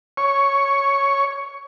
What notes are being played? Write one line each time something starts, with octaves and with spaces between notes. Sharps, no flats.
C#5 C#6